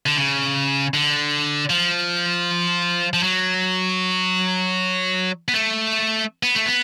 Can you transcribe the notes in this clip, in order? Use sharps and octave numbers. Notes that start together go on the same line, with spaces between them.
D3
C#3
D3
F3
F3
F#3
B3
A3
B3
A3
B3